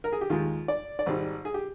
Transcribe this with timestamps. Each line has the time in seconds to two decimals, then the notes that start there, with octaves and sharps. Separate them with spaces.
0.04 A#4
0.12 G#4
0.21 G4
0.30 D#2 D#3 G#3 F4
0.68 D5
0.99 D5
1.06 G#1 G#2 G3 C5
1.45 G#4
1.54 G4